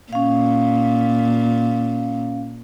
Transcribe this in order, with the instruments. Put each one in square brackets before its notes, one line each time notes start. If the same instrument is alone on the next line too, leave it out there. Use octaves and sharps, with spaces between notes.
[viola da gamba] A#2 [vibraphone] C#4 F5